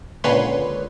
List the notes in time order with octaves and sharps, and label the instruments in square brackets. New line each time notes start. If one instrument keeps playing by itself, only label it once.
[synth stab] C#2 A#2 D3 B4 C#5 C6